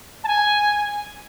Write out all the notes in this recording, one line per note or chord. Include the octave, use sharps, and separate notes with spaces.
A5
G#5